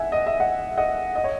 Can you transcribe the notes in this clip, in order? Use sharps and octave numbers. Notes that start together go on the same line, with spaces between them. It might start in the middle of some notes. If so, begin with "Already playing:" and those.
Already playing: E5 F#5 G#5
D#5
E5
D#5 F#5
D#5 F#5
D#5
C#5